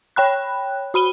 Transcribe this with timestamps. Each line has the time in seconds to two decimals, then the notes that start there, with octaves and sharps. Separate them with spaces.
0.16 C#5 G5 B5 F#6
0.94 F#4 B5 D#7 G7